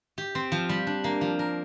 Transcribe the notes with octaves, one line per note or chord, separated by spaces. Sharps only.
G4
C4
F3
G3
D4
A#3
F3
A#4